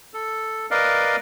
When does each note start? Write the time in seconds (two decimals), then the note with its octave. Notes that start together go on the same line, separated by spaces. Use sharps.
0.14 A4
0.71 A#4 B4 D5 D#5 F5